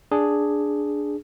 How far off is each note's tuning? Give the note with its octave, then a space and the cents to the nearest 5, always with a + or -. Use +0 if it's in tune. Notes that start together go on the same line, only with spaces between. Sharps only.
D4 +0 G#4 +0